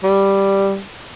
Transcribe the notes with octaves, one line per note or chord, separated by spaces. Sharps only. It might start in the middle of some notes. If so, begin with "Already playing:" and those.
G3